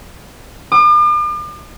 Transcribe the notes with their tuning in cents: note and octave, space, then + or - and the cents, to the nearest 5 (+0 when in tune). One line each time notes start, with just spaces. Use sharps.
D6 +45